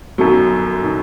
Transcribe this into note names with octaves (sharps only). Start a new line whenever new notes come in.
G1 F#2 D#3 F#3
D#3